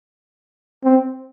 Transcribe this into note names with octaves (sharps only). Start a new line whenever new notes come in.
C4